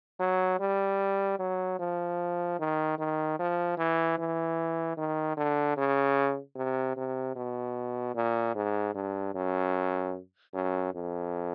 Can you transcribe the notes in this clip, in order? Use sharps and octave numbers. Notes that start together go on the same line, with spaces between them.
F#3
G3
F#3
F3
D#3
D#3
F3
E3
E3
D#3
D3
C#3
C3
C3
B2
A#2
G#2
G2
F#2
F#2
F2